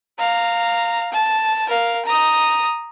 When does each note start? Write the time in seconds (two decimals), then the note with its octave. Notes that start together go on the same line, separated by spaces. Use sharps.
0.19 F5 A#5
1.12 A5
1.68 A#4 F5
2.05 A#5 D#6